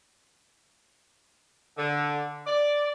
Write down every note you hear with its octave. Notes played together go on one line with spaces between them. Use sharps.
D3
D5